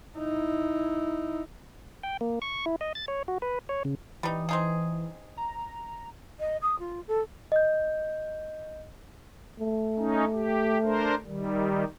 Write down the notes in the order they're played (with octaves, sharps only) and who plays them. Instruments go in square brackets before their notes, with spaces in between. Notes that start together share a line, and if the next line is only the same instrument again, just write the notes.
[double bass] D#4 E4
[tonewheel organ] G5
A#3
C#6
E4
D#5
A6
C#5
F#4
B4
C#5
C#3
[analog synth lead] E3 [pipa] G3 D#4
[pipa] C4 D#4 G#4
[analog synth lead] A#5
[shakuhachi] D#5
D#6
F4
A4
[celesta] D#5 G6
[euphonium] A3
[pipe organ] C#4 D#4
G4
D4 A#4 C5
D#3 G3